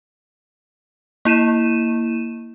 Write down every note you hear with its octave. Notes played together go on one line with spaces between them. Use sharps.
A#3 E4 D#7 E7